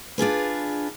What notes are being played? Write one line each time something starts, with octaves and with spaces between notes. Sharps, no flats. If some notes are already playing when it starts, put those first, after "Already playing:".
D4 F4 G#4 B4